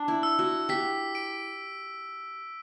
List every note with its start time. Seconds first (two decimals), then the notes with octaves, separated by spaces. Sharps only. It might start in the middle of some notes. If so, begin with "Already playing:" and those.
Already playing: D4
0.08 E4
0.23 E6
0.39 F#4
0.69 G4 B6
1.15 D7